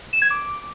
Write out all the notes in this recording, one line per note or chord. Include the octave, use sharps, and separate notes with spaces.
E7
G#6
D6